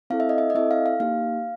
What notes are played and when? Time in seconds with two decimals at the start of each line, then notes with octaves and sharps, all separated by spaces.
0.10 C4 E4 A4 F5
0.20 E5
0.29 D#5
0.38 E5
0.50 D#5
0.55 C4 E4 A4 E5
0.71 F5
0.86 F5
1.00 A#3 D#4 G4 F5